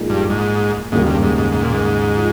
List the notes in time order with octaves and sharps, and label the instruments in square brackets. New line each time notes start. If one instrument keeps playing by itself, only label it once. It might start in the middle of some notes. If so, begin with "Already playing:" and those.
Already playing: [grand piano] A#1 A#2 G#3 D#4 A#4
[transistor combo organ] G2
G#2
[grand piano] D#2 C#3 G3 A#3 [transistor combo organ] G#2
[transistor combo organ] G2
G#2
G#2
G#2
A#2
G#2
[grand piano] F3